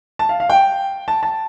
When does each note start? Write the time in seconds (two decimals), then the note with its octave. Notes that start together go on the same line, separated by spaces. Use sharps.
0.19 A5
0.29 F5
0.40 F5
0.50 G5
1.08 A5
1.23 A5